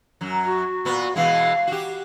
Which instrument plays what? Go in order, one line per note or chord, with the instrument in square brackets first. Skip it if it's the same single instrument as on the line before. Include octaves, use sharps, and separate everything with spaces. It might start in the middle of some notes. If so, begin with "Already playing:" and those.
[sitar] F#2 F#3
[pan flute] F#4
[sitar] A#2 B3
[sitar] B2 E3 G#3 [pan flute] F5
[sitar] F#4 G4